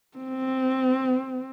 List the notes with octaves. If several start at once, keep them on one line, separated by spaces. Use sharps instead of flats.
C4